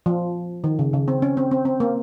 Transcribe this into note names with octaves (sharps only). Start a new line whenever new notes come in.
F3
D#3
C#3
C#3
C4
C#4
C4
C4
C4
A#3